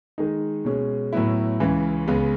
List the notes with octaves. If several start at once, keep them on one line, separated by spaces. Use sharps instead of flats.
D#3 G#3 D#4
B2 G#3 C#4 G#4
A2 F#3 B3 E4
C#2 C#3 E3
C#2 C#3 G#3 B3